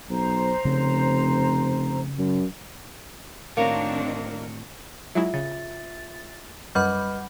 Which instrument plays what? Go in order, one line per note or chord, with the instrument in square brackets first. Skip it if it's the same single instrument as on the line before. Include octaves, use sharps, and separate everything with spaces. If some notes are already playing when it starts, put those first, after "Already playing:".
[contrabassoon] B1 [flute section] C5 A#5
[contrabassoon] F1 [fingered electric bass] C#3
[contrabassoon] F#2
[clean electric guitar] A2 F#4 C#5 [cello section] D#3 C4 D4 [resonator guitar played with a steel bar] A#3
[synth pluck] F#3 G#3 E4 [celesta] F4 E5
[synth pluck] C#3 [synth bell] A6
[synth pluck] F#2 [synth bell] G3 F#5 B5 [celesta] B4 D#5 F6